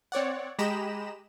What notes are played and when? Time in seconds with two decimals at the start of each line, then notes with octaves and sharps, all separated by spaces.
0.12 C4 C#5 D5 F#5
0.59 G#3 G4 D#5 A#5 B5 E7